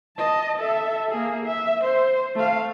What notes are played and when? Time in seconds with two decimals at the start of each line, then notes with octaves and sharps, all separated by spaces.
0.17 D#5 A5
0.59 A4 E5
1.11 A#3 G#4
1.46 E5
1.84 C5
2.35 A3 F5